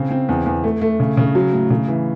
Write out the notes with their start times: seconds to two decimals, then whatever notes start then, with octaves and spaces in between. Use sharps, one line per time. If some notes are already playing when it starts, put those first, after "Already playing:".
Already playing: C#3 C4
0.10 C4
0.29 E2
0.46 E2
0.64 A3
0.81 A3
1.00 C#3
1.17 C#3
1.35 F#3
1.53 A2
1.70 C#3
1.88 E3